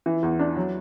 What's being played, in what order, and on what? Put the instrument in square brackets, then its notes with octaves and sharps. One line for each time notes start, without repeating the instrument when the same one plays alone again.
[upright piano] E3
E2
D4
F#3